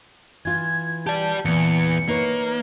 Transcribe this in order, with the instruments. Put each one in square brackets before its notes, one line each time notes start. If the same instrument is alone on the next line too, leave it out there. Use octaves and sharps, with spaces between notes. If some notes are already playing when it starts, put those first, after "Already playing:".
[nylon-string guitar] E3 F4 [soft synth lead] G#6
[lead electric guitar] G4 D5 [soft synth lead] A5
[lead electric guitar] E2 [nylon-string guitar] A#2 E3 [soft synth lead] C#7
[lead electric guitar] A#3 [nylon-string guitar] D#4 B4 C#5